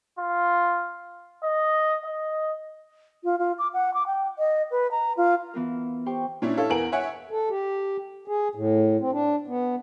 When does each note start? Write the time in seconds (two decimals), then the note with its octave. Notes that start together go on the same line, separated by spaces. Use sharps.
0.19 F4
1.44 D#5
2.06 D#5
3.24 F4
3.39 F4
3.59 D6
3.74 F#5
3.94 D6
4.07 G5
4.38 D#5
4.71 B4
4.91 A#5
5.17 F4
5.54 E3 B3 F4 A#4
6.06 G4 C5 G5 C6 C#6
6.42 A#2 C#4 D4 E4
6.57 E4 A4 C#5 F5
6.70 E2 B3 A#4 G#5 D7 F#7
6.92 C#5 E5 F#5 G#5
7.31 A4
7.49 G4
8.28 G#4
8.55 A2
9.00 C4
9.12 D4
9.48 B3